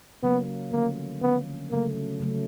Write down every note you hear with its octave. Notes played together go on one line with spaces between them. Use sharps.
C#3 F#3 A#3 B3
D3 F3 A3 A#3 C#4
D3 F3 A3 B3 C#4
C#3 F#3 A3 A#3
C#3 F#3 A3